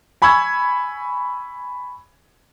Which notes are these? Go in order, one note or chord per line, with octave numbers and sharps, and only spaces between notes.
G#5 B5 C#6 E6 G#6